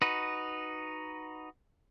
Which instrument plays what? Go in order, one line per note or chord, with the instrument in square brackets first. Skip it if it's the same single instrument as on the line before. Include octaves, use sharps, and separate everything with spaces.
[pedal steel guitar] D#4 F#4 B4